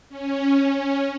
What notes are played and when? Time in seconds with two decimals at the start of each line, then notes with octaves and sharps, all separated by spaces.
0.09 C#4
0.70 C#4